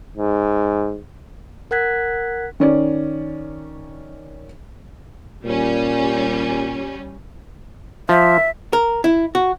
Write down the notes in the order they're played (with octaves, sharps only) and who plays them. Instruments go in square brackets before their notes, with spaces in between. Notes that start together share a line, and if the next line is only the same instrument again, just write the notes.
[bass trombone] G#2
[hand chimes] A#4 F#5 F#6 G#6 B6
[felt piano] D#3 C#4 D5
[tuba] A#2 [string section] G3 C#4
[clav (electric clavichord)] F3 [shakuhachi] E5
[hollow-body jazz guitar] A#4
E4
F#4